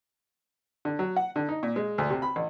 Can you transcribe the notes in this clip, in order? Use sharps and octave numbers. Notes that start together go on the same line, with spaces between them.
D3
F#3
F#5
D3
D#4
A#2
G#3
D2
C3
B5
A1